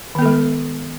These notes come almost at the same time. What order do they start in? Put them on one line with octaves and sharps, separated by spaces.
D#3 B3 A4 G#3